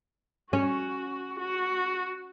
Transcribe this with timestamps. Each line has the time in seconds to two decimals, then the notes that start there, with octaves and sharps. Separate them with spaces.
0.53 C#4 F#4
1.39 F#4